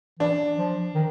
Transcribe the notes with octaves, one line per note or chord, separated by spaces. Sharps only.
E3 D4
F3
D#3